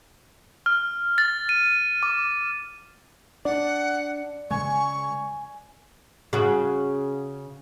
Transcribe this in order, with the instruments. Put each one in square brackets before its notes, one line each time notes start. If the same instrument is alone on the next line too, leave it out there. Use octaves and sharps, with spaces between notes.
[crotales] F6
A6
D#7
D6
[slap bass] D4 [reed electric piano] D5 [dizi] F#5
[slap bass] C#3 G#3 [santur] G#5 [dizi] C#6
[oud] C#3 F#4